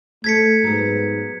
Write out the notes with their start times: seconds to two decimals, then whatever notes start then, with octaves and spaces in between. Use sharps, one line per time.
0.24 A3 A4 C#5 G#6 B6 C#7
0.64 G#2 F#3 B3